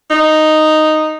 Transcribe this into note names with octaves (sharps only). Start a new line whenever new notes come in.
D#4